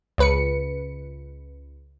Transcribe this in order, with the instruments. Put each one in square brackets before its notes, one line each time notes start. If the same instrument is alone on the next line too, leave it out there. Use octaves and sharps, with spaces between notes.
[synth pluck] C#2 B4 C#7